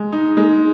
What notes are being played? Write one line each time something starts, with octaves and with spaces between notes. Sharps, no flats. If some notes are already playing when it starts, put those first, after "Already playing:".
Already playing: G#3
D#4
G#3